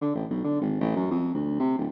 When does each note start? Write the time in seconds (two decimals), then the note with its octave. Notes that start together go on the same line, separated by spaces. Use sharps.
0.01 D3
0.15 A1
0.30 B1
0.44 D3
0.61 G#1
0.80 A1
0.96 F#2
1.11 F2
1.34 D2
1.59 C3
1.78 D1